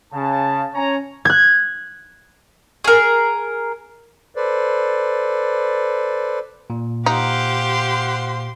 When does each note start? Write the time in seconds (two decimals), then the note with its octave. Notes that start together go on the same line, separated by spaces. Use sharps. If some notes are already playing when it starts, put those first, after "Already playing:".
0.12 C#3 A5
0.74 C#4 C#5 G#5 A#5
1.25 F#6 G#6
2.84 G#4 A#4
4.35 A4 B4 C5 D5
6.70 A#2
7.06 D#4 G4 C5 F5 F#5 C6